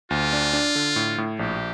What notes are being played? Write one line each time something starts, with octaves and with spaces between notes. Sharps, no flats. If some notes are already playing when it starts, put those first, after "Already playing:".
D2 F4
D4
D4
D3
A2
A2
A#1 G4